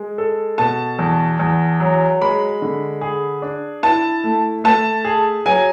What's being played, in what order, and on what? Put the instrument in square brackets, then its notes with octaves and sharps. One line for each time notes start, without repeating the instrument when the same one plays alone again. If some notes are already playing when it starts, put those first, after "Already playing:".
Already playing: [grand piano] G#3
A4
[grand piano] B2 [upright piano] A5
[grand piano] E2
E2
F#3
[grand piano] G#3 [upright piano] B5
[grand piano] D3
G#4
D4
[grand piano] E4 [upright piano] A5
[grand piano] A3
[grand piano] A3 [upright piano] A5
[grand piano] G#4
[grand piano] F#3 [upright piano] G#5